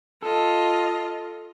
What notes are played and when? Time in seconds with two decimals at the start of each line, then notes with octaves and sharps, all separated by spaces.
0.23 F4 A4 D#5